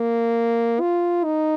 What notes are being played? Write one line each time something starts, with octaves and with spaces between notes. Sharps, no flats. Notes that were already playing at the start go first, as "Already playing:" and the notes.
Already playing: A#3
F4
D#4